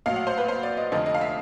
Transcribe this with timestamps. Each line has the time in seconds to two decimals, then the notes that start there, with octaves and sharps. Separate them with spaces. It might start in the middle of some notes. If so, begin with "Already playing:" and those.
0.06 A#1 A2 F#3 F5
0.16 F#5
0.27 C5
0.38 B4
0.48 C5
0.63 D5
0.77 D#5
0.92 F1 F2 D3 F3 D#5
1.06 D#5
1.15 F5
1.21 E5